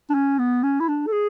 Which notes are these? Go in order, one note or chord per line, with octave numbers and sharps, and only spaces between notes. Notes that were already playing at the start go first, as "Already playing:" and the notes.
D4
C#4
B3
C#4
E4
D4
A4
G#4